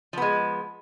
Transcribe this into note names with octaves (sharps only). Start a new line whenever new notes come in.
F3 G#3 B3